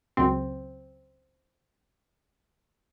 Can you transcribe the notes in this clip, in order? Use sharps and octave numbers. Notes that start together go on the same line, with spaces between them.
C#2 F#2 C4